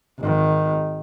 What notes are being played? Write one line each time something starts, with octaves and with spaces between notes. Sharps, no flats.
G#1 D#3